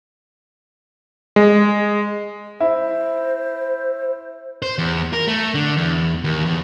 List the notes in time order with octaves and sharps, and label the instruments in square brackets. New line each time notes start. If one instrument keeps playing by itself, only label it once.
[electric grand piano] G#3
[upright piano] E4 [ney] C5
[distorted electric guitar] C5
E2
A#4
A3
D3
E2
D#2
E2